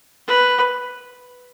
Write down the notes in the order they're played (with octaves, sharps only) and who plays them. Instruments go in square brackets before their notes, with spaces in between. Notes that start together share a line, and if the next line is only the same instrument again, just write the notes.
[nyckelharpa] B4